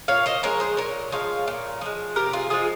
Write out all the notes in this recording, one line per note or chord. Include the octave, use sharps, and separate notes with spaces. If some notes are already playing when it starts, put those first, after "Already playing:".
A#2 C#5 F5
C5 D#5
F3 G#3 A#4 C#5
G#4 C5
A#2 A#4 C#5
F3 G#3 C#5 F5
A#2
F3 G#3
C3 G4 A#4
F4 G#4
F3 G#3 F4 G#4